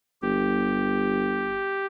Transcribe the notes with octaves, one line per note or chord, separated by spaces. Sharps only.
G1 G4